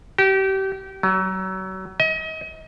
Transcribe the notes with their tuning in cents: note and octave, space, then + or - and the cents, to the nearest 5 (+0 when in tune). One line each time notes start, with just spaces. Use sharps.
G4 -30
F#3 +30
D#5 +35